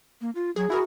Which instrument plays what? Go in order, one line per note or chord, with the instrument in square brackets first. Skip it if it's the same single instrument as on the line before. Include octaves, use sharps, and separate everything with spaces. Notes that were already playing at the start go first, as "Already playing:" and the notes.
[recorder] A#3
F4
[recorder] F#3 [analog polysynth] G#4
[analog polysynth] E4 G#4 A#4 [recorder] F#4